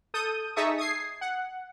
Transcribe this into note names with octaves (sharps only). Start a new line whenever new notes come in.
A4 D#6 G6 D#7
D#4 G#4 E5 A5 C#6 D#6
D#6 G#6 C7
F#5